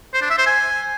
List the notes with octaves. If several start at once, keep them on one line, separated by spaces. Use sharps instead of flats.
C5
D4
E5
C5
G#5